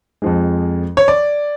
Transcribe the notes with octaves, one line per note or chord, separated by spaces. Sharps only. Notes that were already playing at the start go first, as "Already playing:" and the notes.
F2 F3 G#3
C#5
D5